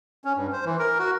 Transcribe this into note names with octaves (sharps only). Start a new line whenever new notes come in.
C#4
G2
C5
E3
A#4
F#4